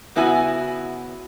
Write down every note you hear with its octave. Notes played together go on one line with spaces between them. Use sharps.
C#3 B3 E4 F#4 G#5